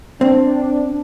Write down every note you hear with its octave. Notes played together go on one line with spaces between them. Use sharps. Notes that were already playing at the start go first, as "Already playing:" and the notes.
C4 D4